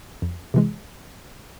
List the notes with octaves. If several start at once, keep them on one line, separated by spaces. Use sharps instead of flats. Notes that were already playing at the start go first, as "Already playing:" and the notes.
F2
C3 E3 G#3